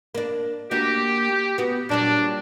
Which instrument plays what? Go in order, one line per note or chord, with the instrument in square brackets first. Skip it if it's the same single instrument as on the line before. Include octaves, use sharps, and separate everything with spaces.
[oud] A#3 D4
[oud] A#3 D4 F#4 [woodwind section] G4
[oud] B3 F#4
[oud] A#2 F#3 G3 [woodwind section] D4